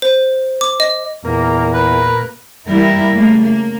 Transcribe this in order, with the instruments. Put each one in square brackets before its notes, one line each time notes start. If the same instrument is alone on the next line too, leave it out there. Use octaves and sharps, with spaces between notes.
[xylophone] C5
D6
D#5
[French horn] E2 [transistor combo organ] A#2 A#4 [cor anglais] A#3
[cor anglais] B4
[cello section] E3 G3 A#3 E4 A#4
C#3 A3 A#3
A#3